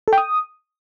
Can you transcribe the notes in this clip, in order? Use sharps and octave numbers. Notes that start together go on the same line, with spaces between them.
A4
G5
D#6